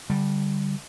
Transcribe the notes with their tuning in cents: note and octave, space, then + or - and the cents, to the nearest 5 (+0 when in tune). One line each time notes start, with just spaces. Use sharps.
D3 +0 G3 +0